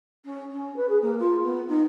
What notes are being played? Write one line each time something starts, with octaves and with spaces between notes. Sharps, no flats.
C#4
C#4
B4
G#4
A#3
F4
B3
D#4